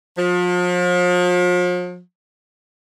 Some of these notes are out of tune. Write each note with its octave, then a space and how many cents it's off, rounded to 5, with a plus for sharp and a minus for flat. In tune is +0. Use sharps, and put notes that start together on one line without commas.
F3 +40